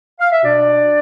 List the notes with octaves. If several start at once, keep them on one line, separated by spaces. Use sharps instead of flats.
F5
E5
B2 D4 D5